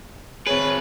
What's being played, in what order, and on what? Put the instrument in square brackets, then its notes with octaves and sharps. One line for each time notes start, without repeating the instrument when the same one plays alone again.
[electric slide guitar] C4 G#4 [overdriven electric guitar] B4 [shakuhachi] C#5